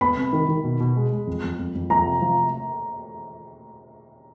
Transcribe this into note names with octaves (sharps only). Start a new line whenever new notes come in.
B3 B5
C3
D#3
D#3
B2
B2
G#3
G#3
F2
F2
F2
F2
F3 A#5
F1
F3